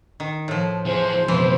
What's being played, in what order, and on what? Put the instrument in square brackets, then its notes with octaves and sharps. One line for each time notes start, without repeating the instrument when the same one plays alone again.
[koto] D#3
A2 F3
[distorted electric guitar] E3 G#4 [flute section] C5
[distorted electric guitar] F2 B2 [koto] E3